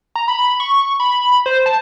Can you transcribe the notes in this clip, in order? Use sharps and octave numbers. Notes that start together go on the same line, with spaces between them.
A#5
B5
C#6
B5
C5
A5